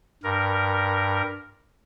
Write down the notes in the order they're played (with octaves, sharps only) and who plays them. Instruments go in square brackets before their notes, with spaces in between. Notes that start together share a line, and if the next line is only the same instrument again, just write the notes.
[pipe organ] G2 A#4